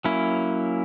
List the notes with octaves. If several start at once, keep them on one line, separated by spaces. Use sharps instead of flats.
F#3 A#3 C#4 E4